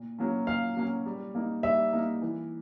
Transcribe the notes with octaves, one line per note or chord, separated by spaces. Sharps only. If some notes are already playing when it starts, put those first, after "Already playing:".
Already playing: A#2
F#3 A#3 C#4
A#2 F5
F#3 A#3 C#4
G3
A#3 D#4
G3 E5
A#3 D#4
E3